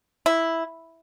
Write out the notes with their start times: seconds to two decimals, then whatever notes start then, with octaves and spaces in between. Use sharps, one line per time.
0.26 E4